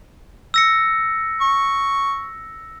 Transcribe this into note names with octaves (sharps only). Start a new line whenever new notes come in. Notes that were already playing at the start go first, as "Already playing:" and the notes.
E6 A#6 C#7
C#6